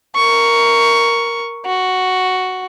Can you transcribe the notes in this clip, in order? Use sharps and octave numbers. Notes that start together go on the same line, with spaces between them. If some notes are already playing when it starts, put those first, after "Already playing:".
A#4 C#6
F#4